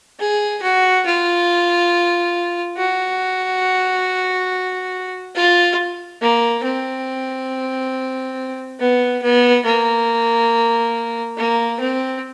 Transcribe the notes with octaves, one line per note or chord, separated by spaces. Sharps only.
G#4
F#4
F4
F#4
F4
A#3
C4
B3
B3
A#3
A#3
C4